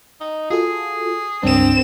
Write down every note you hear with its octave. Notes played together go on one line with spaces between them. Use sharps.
D#4
F4 F#4 G#4 A4
C#2 G2 C4 D4 E7